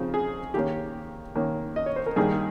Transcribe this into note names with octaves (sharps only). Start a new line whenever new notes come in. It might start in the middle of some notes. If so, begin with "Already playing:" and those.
Already playing: C#3 F3 C4 D#4
G#4
D#3 A#3 C#4 G4
D#3 A#3 C#4
D#5
C#5
C5
A#4
G2 D#3 A#3 D#4 G#4